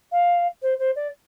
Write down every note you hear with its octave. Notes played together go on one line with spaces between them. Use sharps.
F5
C5
C5
D5